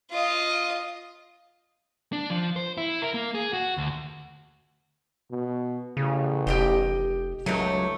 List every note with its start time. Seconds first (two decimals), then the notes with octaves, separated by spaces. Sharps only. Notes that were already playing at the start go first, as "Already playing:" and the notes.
0.11 F4 D#5
2.13 D4
2.30 F3
2.56 C5
2.78 E4
3.02 A#4
3.14 A#3
3.35 G#4
3.53 F#4
3.78 D2
5.31 B2
5.97 A1 C#3
6.47 F1 G4 D#5 G5
7.46 C#2 F#3 A3 A#3 D#4